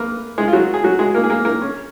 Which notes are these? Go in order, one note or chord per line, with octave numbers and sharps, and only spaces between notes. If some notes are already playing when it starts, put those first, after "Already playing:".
Already playing: A#3 A#4 B4
G#3 G#4
F4
F#3 F#4
G#4
F#3 F#4
G#3 G#4
A#3 A#4
G#4
A#3 A#4
A#3 A#4
C#4